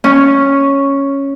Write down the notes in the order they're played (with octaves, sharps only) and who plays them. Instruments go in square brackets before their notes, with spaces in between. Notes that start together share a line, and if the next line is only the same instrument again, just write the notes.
[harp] C#4